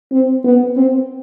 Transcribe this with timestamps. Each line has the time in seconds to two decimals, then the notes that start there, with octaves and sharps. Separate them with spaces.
0.12 C4
0.44 B3
0.77 C4